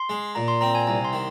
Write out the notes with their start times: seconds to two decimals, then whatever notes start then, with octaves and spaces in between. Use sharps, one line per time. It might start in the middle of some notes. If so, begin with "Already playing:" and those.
Already playing: C6
0.10 G#3
0.35 A#2 A#5
0.48 C6
0.61 C4 A#5
0.75 G#5
0.87 C2 A#5
1.05 C6
1.13 D#3